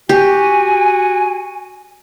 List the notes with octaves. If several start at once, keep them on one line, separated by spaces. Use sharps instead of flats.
F#4 G4 G#5